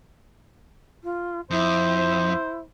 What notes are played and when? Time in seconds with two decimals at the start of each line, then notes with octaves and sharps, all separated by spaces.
1.03 F4
1.51 F2 E4 C5